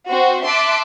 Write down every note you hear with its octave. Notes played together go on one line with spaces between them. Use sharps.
C4 F#4 C5 C6
E5 A5 C6 D6 F#6 D7